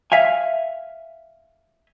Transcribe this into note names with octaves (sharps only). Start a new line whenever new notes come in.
E5 F5 G#5